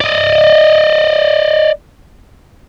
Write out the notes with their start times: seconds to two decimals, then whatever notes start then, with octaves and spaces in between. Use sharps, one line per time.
0.01 D5 D#5